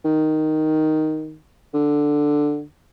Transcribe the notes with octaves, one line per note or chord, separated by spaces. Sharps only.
D#3
D3